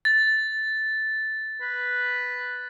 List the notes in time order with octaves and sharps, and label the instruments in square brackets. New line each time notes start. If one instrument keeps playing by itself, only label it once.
[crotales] A6
[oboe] B4